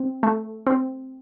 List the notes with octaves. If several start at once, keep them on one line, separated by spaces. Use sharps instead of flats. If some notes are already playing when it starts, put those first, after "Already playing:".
Already playing: C4
A3
C4